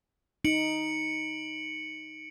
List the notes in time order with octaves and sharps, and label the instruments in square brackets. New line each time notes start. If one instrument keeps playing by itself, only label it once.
[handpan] D#4 [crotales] C#7 D7 F#7